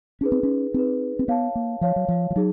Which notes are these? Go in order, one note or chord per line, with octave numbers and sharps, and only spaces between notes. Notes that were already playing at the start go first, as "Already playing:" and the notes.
C#4 D#4 G#4 B4
C4
C#4
C4 D#4 G#4 B4
C4
B3 C#5 F5 A5
A#3
F3 C#5 F5 A5
F#3
F3
F3
F#3 D#4 G#4